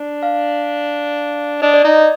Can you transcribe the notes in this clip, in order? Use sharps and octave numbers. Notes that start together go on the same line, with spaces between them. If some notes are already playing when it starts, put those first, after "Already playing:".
Already playing: D4
F5
D4 D#5
D5
D#4 D#5